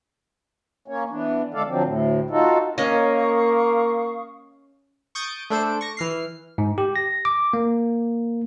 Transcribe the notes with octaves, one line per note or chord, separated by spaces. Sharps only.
A#3 C#4 C#5
E3 B3 D4
D3 G#3 A4 D5 F5
D3 F3 F#3 C4
D2 A2
D#4 F4 F#4 A4
A#3 C#4 D#5 F5 C#6 D#6
C#6 D#6 G6 A6 D7
A3 D4 A4 C5 D7
C#6 A#6
E3 F6 C7
G#2
G4
A#6
D6
A#3